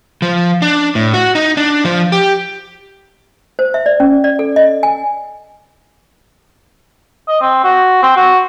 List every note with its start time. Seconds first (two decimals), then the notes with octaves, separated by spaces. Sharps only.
0.22 F3
0.62 D4
0.95 A2
1.14 F#4
1.35 D#4
1.57 D4
1.85 F3
2.12 G4
3.59 C5
3.74 E5
3.86 D5
4.00 C#4
4.24 D5
4.39 A4
4.56 D#5
4.83 G#5
7.28 D#5
7.41 C4
7.64 F#4
8.03 C4
8.17 F#4